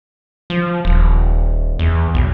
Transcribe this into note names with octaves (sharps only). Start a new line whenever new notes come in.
F3
D#1
E2
B1